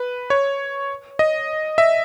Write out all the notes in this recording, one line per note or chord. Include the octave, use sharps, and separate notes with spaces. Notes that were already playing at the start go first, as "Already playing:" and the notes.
Already playing: B4
C#5
D#5
E5